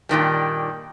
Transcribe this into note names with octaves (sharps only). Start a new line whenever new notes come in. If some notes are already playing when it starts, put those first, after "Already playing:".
G2 A#2 D#3 G3